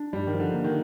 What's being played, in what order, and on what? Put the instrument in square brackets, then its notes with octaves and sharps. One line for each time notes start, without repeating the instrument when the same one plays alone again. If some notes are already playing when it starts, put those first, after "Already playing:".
Already playing: [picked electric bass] D4
[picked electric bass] G2 [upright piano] G3
[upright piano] D#3
[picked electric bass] F3
[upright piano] D3
[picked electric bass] A#3
[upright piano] D#3